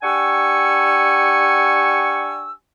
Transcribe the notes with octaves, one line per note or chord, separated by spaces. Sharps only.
D4 G4 F#5 G#5 C#6 E6